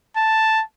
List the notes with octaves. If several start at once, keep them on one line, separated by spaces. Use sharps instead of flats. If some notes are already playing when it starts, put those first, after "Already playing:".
A5